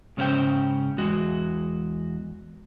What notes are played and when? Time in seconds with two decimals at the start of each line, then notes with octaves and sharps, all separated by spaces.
0.17 G#2 C#3 C#4 F4 C5 G5
0.98 E2 G#3 F#4